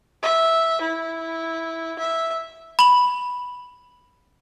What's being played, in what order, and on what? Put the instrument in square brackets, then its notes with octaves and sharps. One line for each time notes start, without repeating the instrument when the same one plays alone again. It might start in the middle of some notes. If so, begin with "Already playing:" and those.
[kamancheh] E5
E4
E5
[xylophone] B5 F#7